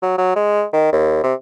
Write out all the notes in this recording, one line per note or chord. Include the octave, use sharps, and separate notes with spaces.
F#3
F#3
G#3
D#3
D#2
C3